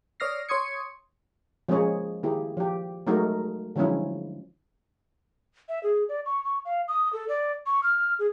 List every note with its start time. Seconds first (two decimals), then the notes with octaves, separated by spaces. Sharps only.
0.20 C#5 D5 D#6 F6 A#6 C7
0.49 C#5 C6 C#6 D#6 G#6 C#7
1.68 F3 G#3 A#3 C#4 G#4 C#5
2.23 D#3 A#3 E4 G4 G#4
2.57 F3 G4
3.07 F#3 G#3 A3 D#4 F#4 A#4
3.76 D3 F3 F#3 G#3 C#4 E4
5.69 E5
5.83 G#4
6.09 D5
6.26 C#6
6.44 C#6
6.65 F5
6.88 D#6
7.13 A4
7.29 D5
7.66 C#6
7.83 F6
8.19 G#4